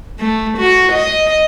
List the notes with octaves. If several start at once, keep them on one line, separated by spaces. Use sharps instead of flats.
A3
F#4
D#5